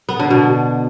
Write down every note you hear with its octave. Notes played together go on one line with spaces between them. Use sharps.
B3
D3
B2